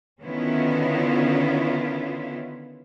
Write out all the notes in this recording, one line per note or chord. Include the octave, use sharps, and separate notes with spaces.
D3 D#3 B3 C#4 E4 F4